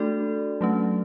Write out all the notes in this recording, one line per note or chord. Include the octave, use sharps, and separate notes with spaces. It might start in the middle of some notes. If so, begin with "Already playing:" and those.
Already playing: A3 D4 F#4 A4 D5
F#3 A3 C#4